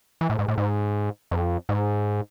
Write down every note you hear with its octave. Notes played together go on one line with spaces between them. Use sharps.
E3
A2
G#2
A2
G#2
F2
G#2